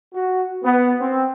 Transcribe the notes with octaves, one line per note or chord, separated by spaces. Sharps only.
F#4
B3
C4